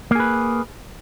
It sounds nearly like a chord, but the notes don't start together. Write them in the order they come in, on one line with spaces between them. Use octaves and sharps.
A#3 G#4 B4